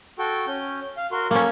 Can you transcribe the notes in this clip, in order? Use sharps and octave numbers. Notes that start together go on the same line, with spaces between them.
F#4 A4 G5
C#4 G6
F5
F#4 A#4 C6
A#3 C#4 A4